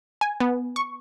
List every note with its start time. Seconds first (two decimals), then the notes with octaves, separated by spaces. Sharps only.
0.21 G#5
0.40 B3
0.76 C#6